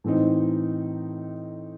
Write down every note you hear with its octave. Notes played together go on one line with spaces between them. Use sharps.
A2 E3 C4 D#4